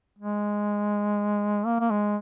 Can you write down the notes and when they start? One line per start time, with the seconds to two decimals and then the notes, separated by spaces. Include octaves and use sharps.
0.18 G#3
1.66 A#3
1.80 A#3
1.90 G#3